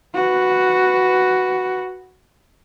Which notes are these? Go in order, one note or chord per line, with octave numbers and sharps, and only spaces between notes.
F#4 B4